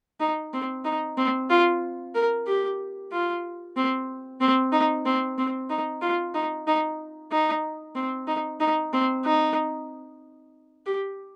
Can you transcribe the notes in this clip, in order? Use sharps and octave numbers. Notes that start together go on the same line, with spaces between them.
D#4
C4
D#4
C4
F4
A#4
G4
F4
C4
C4
D#4
C4
C4
D#4
F4
D#4
D#4
D#4
C4
D#4
D#4
C4
D#4
G4